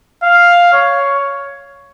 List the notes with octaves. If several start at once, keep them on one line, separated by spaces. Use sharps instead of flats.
F5
C#5